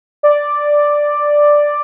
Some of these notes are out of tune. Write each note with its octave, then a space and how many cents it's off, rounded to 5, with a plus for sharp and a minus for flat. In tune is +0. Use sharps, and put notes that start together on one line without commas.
D5 +0